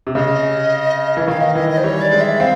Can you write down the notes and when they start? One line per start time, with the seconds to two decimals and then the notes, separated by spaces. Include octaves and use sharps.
0.07 C3
0.15 C#3 D#5
1.17 E3
1.28 D#3 F5
1.41 D#5
1.55 E3 D#5
1.70 D#5
1.78 C5
1.84 G3 C#5
2.02 D5
2.12 G#3
2.21 E5
2.40 C4 F5